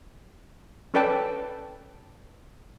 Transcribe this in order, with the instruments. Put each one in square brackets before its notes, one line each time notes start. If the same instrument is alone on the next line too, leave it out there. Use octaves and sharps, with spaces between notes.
[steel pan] C#4 A4 B4 D5 G5 A5